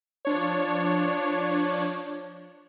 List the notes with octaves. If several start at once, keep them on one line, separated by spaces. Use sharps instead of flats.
F3 D4 C#5